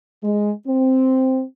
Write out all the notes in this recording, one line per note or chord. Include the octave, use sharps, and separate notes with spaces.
G#3
C4